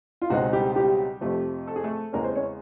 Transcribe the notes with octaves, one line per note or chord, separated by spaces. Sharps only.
F4
C#2 B2 G#3 C4 D#4 F#4
G3 G4
G3 G4
F2 C3 F3 A3
A4
G#4
A3 A4
E2 C#3 E3 G#3 A#3 C#4 A#4
C4 C5
C#4 C#5